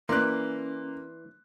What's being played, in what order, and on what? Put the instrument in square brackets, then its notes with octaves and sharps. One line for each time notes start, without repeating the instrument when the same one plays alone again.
[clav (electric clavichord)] E3 D5 [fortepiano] A#3 [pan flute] C#4 [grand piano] C6 F#6